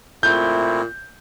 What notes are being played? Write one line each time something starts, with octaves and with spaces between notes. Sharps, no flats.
A#2 A3 C4 E4 G6